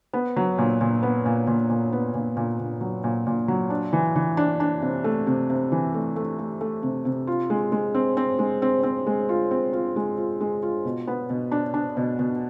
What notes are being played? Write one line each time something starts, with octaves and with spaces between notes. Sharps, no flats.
B3
F#3
A#2
A#2
B3
A#2
A#2
A#2
B3
A#2
A#2
A#2
F#3
A#2
A#2
F#3
D4
E3
E3
D4
D4
C3
A3
C3
C3
E3
A3
A3
A3
A3
C3
C3
F4
G#3
G#3
C4
C4
G#3
C4
C4
G#3
F4
C4
F4
G#3
F4
G#3
F4
B2
B3
B2
D4
D4
B2
B2